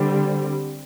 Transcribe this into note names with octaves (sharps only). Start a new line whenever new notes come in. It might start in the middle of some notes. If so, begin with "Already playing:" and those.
Already playing: D3 G3 C4